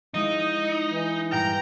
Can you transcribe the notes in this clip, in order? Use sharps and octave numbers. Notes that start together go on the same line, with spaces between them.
F3 G#3 D#4 E4 D#5
E3
G2 A#2 G5 A#5 F6